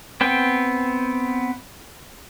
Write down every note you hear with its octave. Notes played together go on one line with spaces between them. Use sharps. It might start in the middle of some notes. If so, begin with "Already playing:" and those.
B3 C4 G5